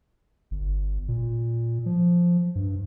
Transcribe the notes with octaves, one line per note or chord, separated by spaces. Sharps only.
G1
A#2
F3
G2